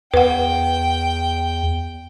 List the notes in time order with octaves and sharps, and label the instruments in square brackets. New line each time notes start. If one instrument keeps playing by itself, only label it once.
[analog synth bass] E2 [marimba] B4 F#5 [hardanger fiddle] G5